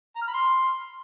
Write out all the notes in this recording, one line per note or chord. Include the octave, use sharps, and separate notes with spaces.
A#5
F6
B5
C6